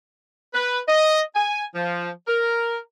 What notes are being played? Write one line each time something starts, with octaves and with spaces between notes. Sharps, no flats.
B4
D#5
G#5
F3
A#4